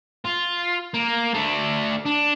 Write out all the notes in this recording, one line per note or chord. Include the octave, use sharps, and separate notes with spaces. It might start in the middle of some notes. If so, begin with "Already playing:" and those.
F4
A#3
A3 D4
D4